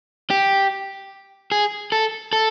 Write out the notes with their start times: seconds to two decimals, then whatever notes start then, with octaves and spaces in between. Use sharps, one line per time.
0.30 G4
1.52 G#4
1.92 A4
2.33 A4